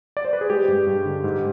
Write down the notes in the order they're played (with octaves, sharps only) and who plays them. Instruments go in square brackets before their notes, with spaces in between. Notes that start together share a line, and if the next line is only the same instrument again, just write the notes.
[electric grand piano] D5
C5
B4
G#4
G#3 G4
G2
G2
D3
G#2